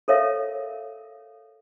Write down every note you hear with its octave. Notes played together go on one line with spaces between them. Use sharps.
A4 A#4 C#5 E5 F5